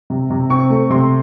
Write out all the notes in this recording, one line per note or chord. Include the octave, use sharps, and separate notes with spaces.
C3
C3
C4 C#6
A3
C3 C6